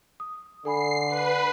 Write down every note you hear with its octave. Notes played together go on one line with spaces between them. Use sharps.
D#6
D3 A4 G#5 B5 C7
B4